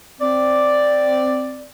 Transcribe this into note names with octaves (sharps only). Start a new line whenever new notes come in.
C4 D5